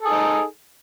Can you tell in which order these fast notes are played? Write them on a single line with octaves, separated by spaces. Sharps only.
A4 G#4 D#4